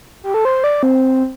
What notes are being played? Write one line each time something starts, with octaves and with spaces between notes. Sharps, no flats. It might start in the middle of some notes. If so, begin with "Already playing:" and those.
G4
A4
C5
D5
C4